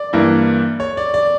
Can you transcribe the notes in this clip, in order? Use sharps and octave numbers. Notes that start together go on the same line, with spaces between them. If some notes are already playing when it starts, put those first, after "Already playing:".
Already playing: D5
G2 E3 A#3 E4
C#5
D5
D5